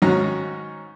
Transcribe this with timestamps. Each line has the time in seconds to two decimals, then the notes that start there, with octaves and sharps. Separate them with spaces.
0.02 G#2 D#3 C#4 F#4 A#5